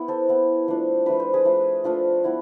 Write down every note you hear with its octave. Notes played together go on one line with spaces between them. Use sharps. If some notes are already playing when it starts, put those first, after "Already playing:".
Already playing: B3 E4
A4 C5
B3 E4
F3 A3 D4
F3 A3 D4 B4
C5
G#4 B4
F3 A3 D4
F3 A3 D4 F4 A4
B3 E4